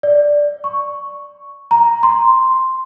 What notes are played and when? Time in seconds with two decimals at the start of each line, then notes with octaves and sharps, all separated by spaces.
0.03 D5
0.64 C#6
1.71 A#5
2.03 C6